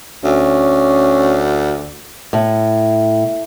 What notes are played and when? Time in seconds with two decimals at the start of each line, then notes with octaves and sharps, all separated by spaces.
0.24 D2 C#4
2.33 A2